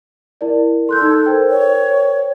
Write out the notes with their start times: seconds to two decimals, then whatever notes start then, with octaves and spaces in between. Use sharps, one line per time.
0.41 E4 A#4 D5
0.89 A4 C6 F#6 G6
1.01 D#4 G#6
1.26 A#4 C5 G5
1.50 C#5